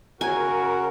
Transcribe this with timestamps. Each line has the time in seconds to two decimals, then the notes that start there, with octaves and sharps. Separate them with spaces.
0.21 C#3 F#4 A#4 G#5